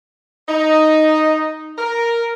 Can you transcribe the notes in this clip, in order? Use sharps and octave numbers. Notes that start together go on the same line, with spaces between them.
D#4
A#4